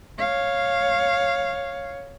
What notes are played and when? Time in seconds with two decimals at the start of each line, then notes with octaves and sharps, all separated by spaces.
0.19 C#5 F5